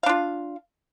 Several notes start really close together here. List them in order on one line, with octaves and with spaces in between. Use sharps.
F5 D4 F4